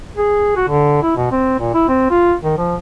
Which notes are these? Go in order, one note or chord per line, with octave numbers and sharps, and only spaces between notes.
G#4
F#4
D3
E4
B2
C4
A#2
E4
C4
F4
D#3
F3